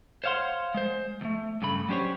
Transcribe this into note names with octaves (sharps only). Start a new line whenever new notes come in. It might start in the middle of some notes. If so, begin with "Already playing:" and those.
C5 C#5 F5 F#5 C6
G#3 C5
D#2 A3
G2 C#3 A3 B5
F#3 C#4 D4 G4 C5 C#5